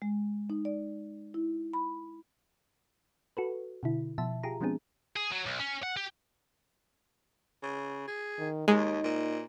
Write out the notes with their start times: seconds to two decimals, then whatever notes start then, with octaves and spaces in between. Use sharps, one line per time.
0.02 G#3
0.50 D#4
0.65 D5
1.34 E4
1.73 B5
3.37 F#4 A4 B4
3.83 B2 D3 E4
4.18 B2 F3 E5 A5
4.43 F4 G4 G#4 A#5
4.61 F3 G#3 B3 C4 D4 G#4
5.16 G#4
5.31 F#3
5.46 B1
5.60 C#4
5.83 F#5
5.96 G4
7.63 C#3
8.08 G#4
8.39 D#3
8.68 D#2 G#3 D#4
9.04 A#2